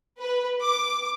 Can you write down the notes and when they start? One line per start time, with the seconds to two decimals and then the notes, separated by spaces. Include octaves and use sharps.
0.20 B4
0.63 D6